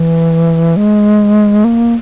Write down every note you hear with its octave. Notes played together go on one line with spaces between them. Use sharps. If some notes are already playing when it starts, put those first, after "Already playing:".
Already playing: E3
G#3
A#3